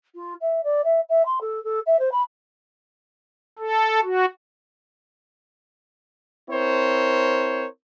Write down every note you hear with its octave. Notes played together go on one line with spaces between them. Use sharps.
F4
E5
D5
E5
E5
C6
A4
A4
E5
C5
B5
A4
F#4
C4 E4 A#4 C5 C#5